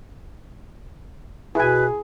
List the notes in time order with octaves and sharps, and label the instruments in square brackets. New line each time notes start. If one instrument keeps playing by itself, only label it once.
[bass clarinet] B2 [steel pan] E4 G#5 [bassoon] G#4 [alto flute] B4